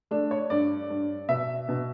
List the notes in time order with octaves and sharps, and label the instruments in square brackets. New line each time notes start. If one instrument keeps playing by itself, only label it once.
[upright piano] A3 D4
C#5
G2 D5
G2
B2 E5
B2